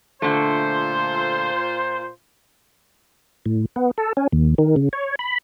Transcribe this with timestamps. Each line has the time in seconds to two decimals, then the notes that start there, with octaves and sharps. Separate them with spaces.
0.22 A#2 D3 A3 F4 C5
3.46 A2
3.76 B3
3.98 A4
4.17 C#4
4.32 D#2
4.58 D#3
4.76 C#3
4.93 C#5
5.19 B5